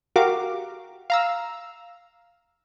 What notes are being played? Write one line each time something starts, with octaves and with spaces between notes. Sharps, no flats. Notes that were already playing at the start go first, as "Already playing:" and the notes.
F#4 G4 A#4 F5 D6
F5 A#5 E6